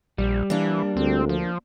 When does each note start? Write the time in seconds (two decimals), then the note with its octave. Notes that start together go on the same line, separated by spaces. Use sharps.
0.18 A#1 G3
0.50 E3 A#3 D4
0.97 D2 C4
1.29 F3